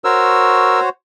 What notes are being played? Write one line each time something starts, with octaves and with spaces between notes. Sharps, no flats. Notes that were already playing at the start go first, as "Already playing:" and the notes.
F#4 A#4 C5 C#5 E6